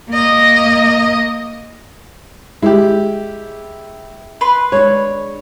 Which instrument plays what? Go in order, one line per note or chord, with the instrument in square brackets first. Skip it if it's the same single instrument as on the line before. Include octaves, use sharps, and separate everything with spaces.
[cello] A#3 D#5
[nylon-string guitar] G#3 [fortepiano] E4 G4
[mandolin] B4 C6
[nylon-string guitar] G#3 D4 [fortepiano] C#5